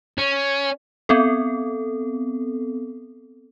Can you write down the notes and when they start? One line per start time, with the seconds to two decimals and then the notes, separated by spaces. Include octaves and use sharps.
0.18 C#4
1.09 B3 C4 A4